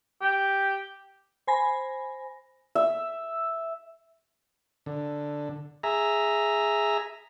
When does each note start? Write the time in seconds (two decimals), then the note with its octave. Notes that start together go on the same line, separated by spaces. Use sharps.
0.22 G4
1.47 C5 G#5 B5 A#6
2.75 E5
4.86 D3
5.83 G#4 E5 A#5